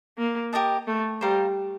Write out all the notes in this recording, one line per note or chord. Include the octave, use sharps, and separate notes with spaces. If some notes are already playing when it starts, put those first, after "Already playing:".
A#3
G4 A#4 D#5 A5
A3
G3 C5 F5 A#5